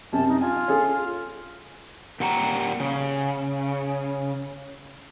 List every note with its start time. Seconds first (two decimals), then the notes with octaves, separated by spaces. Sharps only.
0.13 F#2 C3 A5
0.28 D#4
0.41 F4 G#5
0.68 C#4 G#4 A4
2.20 A#2 G4 F#5 A#5
2.80 C#3